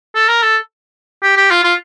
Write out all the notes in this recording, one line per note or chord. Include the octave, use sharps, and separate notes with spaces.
A4
A#4
A4
G4
G4
F4
F4